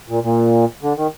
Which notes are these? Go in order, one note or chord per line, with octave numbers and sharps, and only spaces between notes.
A#2
A#2
D3
D#3